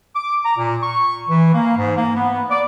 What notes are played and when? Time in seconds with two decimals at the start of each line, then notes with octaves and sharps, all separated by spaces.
0.16 D6
0.45 A#5
0.57 A#2
0.83 C#6
1.29 E3
1.54 A#3
1.78 G#2
1.97 A#3
2.16 B3
2.51 D5